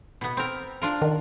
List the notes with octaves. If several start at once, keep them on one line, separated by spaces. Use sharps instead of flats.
B2 B3
C4 A#4
D4 F4 A#4
D#3